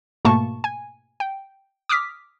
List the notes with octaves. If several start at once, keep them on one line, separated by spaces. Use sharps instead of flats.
G#2 B2 A3 A#3 A5 C#6
G#5
G5
D6 D#6 F6 B6